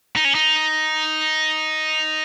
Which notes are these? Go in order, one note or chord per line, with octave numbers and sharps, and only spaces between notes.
D#4
C#4
D#4